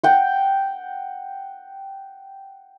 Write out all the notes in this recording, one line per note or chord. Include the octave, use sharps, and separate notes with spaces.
F#5 G5